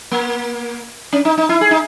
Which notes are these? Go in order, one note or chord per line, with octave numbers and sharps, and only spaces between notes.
A#3
C#4
D#4
D#4
E4
G#4
D#4